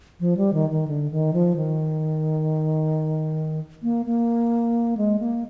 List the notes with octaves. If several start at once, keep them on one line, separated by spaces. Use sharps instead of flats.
F3
G3
D#3
D#3
D3
D#3
F3
D#3
A#3
A#3
G#3
A#3